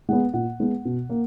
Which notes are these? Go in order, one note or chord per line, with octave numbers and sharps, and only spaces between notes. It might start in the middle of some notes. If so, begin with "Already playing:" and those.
G#3 B3 F#5
A#2 F#5
G#3 B3
B2
A#3